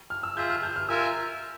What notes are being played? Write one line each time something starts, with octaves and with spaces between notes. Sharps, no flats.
F6
E6
F4 G#4 E5 G6
F6
G6
F6
F4 A#4 E5 G#5 E6